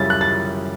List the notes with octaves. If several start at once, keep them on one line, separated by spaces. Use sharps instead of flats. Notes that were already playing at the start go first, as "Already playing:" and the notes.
Already playing: F#2 C#3 G3 C#4 E4 A6
F#6
A6